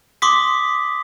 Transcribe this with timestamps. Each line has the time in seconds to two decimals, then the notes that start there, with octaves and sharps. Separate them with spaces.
0.22 C6 D6 D#6 B6